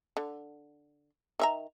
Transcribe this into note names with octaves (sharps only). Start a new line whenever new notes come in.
D3
D#3 E5 A#5